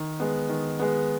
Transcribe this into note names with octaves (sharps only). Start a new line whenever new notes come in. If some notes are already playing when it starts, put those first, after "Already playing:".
Already playing: D#3
G#3 B3
D#3
G#3 B3